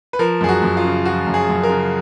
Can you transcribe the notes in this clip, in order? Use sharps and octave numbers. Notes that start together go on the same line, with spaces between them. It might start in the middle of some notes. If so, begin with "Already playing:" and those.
B4
F3 A#4
F#2 G#4
F#4
F#2
F4
C#3
F3 F#4
F#2
G#4
F#2
A#4
C#3